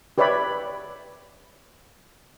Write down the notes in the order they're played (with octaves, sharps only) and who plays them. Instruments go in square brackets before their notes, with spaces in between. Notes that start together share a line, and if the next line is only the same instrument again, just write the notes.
[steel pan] G4 B4 C#5 D5 E5 B5